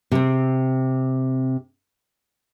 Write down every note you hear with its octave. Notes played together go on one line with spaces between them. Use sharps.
C3 C4